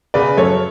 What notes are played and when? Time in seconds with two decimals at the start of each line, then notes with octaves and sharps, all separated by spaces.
0.14 C#3 B4 D5
0.37 F#2 A4 C#5